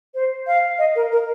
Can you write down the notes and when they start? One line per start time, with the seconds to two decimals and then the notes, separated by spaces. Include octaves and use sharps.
0.15 C5
0.47 F5
0.79 D#5
0.96 A#4
1.12 A#4